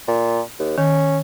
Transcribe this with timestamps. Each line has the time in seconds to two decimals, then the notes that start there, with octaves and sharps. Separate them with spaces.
0.08 A#2
0.59 D#2
0.78 D#3 C#4